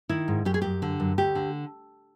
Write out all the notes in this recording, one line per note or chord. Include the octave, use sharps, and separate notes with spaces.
D#3 E4
G#2
F#2 G4
G#4
F#2 G4
D3
F#2
D2 G4
D3